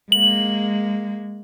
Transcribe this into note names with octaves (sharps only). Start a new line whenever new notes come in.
G#3 A#3 F#7